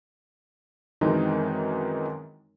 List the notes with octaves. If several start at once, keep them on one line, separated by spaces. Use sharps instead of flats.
F#2 D#3 E3 G#3 C4 D#4